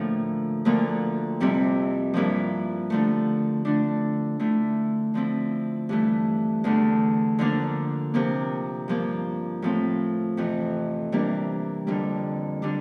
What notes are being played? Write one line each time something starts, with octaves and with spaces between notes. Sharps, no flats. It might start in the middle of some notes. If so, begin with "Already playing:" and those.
Already playing: A2 D3 F3 A#3
D2 D3 F3 A#3
F2 C3 G3 C4 E4
G2 F3 A#3 E4
D3 F3 A3
D3 A3 D4
D3 A3 E4
D3 F3 C4 E4
G2 E3 A3
E2 D3 A3 D4
D3 F3 A#3 D4
C3 F3 A#3
G2 F3 A#3
A2 F3 C4
F2 C3 E3
C3 E3 G3 A#3 D4
F2 D3 G3 A#3
D3 G3 D4